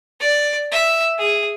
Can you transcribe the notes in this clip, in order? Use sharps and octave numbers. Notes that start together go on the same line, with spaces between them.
D5
E5
G#4